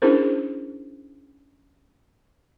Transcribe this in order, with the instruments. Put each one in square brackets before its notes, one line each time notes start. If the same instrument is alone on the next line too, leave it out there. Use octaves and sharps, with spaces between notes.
[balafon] C#4 D4 E4 G#4 A#4 C5